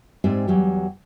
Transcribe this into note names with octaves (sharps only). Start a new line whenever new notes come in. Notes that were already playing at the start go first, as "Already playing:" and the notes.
G#2 C4 G4 D5 E5 G#5
E2 F#3 G3 G4